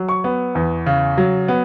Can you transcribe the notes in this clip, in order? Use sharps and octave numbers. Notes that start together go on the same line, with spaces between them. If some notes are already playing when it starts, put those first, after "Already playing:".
Already playing: F#3
C#6
B3
E2
C#3
F#3
B3